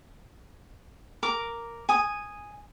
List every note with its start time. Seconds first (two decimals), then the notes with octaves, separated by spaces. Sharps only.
1.23 A#4 D6
1.89 G#5 D#6